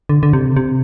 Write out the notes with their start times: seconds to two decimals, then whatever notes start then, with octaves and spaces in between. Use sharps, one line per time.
0.09 D3
0.23 D3
0.33 C3
0.56 C3